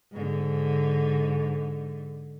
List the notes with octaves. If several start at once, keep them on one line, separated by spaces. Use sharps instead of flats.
G#2 D3